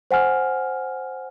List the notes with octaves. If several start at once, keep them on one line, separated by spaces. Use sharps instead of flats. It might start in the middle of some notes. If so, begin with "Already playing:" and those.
C5 F#5 G#5 F6